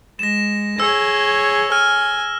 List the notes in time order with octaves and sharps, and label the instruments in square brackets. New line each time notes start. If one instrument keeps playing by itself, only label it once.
[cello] G#3 [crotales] A#6 E7
[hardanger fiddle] G#4 [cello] C#5 [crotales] E6
[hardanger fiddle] G#5 [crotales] F6